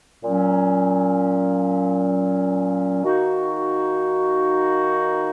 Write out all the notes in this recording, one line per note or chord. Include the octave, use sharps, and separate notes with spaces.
A#2 F#3 C#4
D#3 A#3 D#4 F#4